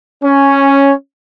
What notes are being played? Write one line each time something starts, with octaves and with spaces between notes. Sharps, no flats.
C#4